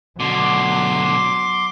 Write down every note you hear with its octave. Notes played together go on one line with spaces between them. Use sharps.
B2 D3 F#3 C6 D6